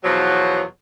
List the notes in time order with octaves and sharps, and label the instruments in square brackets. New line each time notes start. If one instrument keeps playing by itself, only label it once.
[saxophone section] E2 B2 F3 F#3